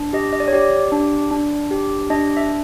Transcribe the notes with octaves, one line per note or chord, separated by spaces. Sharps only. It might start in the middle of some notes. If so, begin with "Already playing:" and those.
Already playing: D4
G4 D#5
D#5
D5
C#5
G4 D5
D4
D4
G4
D4 D#5
E5